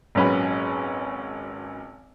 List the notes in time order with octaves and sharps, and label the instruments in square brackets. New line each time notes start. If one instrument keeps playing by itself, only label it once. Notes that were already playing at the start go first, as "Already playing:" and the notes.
[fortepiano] G#1 A#2 F#3 C#4 B4 B5